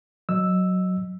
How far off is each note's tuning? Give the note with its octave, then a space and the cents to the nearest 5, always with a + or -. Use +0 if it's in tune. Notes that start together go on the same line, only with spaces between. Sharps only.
F#3 +0 D#5 +0 E6 +0